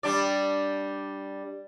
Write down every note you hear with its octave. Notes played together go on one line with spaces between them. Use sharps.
G3 D4 D5